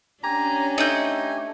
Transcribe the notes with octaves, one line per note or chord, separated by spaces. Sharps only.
C#4 D4 G4 G#5 A#5
A3 D#4 G6